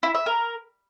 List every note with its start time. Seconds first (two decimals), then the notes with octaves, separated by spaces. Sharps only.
0.03 E4
0.15 E5
0.26 A#4